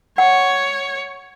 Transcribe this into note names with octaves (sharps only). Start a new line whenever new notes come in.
C#5 F#5